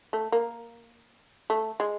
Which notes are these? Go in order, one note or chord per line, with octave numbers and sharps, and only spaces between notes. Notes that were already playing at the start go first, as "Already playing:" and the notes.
A3
A#3
A3
G#3